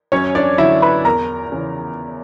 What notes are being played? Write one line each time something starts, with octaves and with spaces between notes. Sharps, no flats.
F#2 C#4 C#5
D4 D5
D3 F#3 E4 E5
B4 B5
E2 A#4 A#5
C#3 E3